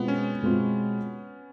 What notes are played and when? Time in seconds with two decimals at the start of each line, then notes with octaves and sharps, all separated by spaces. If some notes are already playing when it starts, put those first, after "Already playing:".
Already playing: B2 G#3 B3 C4 F4
0.08 C#4
0.43 B2 G#3 C4 F4